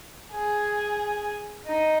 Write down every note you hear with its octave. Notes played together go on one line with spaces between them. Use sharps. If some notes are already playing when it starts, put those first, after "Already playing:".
G#4
D#4